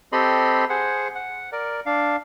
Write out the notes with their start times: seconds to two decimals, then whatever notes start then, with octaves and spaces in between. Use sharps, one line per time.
0.12 C4 G4 A4 D#5 B5 C6
0.69 G#4 C5 F#5
1.15 F#5
1.52 A#4 D5
1.86 D4 F5